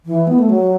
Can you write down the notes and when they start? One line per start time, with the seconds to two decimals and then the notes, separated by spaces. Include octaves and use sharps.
0.06 E3
0.27 B3
0.39 A3
0.49 F#3